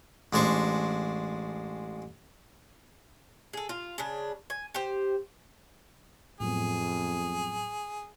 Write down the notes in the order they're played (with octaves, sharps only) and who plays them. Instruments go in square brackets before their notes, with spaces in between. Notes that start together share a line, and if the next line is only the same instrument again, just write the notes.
[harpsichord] A1 G#3 D4 C5 C#6
[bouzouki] G#4 A4
F4
C#3 D4
G#5
G4 C5
[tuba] F2 [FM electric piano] A2 F#3 B3 [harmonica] G#4